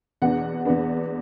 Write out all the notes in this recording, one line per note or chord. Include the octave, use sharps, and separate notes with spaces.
E2 B2 B3 D4 F#5
E2 B2 B3 D4